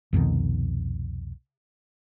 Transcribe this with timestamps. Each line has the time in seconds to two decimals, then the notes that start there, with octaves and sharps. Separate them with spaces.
0.13 C2 F2 B2 D#3